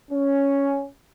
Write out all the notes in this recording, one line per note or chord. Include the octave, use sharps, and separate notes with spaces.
C#4